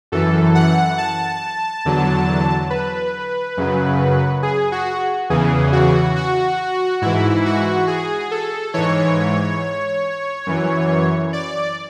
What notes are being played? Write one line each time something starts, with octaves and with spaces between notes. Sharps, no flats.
F#2 E3 A4
F#5
A5
E2 D3 F#3
B4
F#2 C#3 F#3
G#4
F#4
E2 C#3 E3 G#4
F#4
F#4
G#2 E3 E4
F#4
G#4
A4
G#2 E3 C#5
F#2 E3
D5